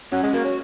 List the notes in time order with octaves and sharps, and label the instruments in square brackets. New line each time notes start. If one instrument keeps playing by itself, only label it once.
[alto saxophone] F#3 [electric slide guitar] C#4
[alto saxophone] G#3
[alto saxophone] A#3 [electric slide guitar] F#4
[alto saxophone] C#4